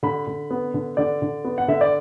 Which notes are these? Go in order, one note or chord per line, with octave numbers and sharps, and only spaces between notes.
D3 B5
D3
B3
D3
D3 D5
D3
B3
F#5
D3 E5
D5